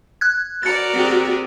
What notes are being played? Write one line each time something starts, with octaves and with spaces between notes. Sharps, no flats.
F#6 G#6
F#4 A#4 D5 A6 C#7
C4 G4 G#4